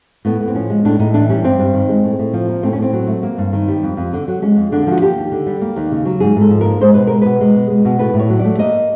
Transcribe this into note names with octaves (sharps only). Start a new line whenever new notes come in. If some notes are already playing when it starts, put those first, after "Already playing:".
A2 B3
A2
C4
F3 C#4
G#3
A2 D4
A2 D#4
E3 D4
G3 C#4
G2 C4
G2
D#3
G#3
A2
A2
F3
A#3
A2 C4
C#4
A2 C4
F#3
A3
A#3
G2
D#3
G3
F2
F2
D3
F#3
G#3 C#4
F2
D3 D4
F3 F#4
A#3 G4
D#2
D3
G3
A#3
D#2
C#3
F#3
G#2 G#4
G#2
A4
F3
A#3 A#4
G#3 C5
B2 B4
G#3 A#4
B2 B4
G#3
B2
G#3
B2
A2 B4
A2
C#5
F#3
A3 D5
A#3 D#5